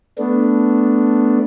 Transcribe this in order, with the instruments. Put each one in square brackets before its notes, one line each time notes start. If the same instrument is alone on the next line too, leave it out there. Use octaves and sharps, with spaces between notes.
[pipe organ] A3 B3 D4